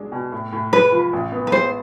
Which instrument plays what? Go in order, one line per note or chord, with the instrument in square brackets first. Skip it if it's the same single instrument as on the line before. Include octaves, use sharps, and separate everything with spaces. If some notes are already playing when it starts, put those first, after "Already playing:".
Already playing: [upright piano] B1 G#3 D4
B2
A2
A2
[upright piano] G#3 [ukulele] B4
[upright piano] F3
A1
B3
[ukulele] B4
[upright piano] G#3 [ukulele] C5